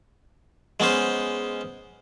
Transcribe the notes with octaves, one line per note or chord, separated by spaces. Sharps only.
G#3 B3 C#4 C5